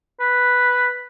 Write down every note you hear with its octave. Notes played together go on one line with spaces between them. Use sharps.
B4